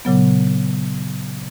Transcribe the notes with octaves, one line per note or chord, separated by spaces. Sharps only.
A#2 C#3 F#3 B3